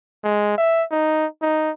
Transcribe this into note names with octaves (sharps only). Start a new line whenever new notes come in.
G#3
E5
D#4
D#4